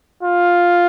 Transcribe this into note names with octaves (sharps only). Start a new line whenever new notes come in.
F4